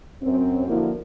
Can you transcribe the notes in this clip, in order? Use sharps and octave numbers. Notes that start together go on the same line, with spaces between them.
F#2 C4
D3 F3 A#3 E4 F#4